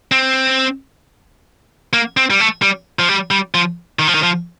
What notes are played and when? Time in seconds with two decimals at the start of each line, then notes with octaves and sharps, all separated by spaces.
0.12 C4
1.93 A#3
2.17 C4
2.30 G3
2.40 A3
2.62 G3
2.99 F3
3.09 G3
3.31 G3
3.55 F3
3.99 D#3
4.08 F3
4.15 D#3
4.23 F3